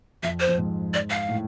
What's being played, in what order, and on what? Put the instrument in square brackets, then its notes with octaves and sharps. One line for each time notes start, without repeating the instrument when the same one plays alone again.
[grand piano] F2 [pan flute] E5
[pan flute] C5
[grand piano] F2
G#2
[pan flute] D5
F5
[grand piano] A2